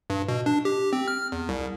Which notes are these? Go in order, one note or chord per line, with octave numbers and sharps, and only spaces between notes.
G2
B2
D4
G4
C4
F6
E2
C2